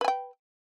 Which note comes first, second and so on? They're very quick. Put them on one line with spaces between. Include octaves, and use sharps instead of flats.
B4 G#5 G5